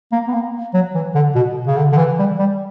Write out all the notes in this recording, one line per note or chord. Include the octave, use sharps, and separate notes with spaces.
A#3
B3
A#3
F#3
E3
D3
B2
C#3
D3
D3
E3
G3
G3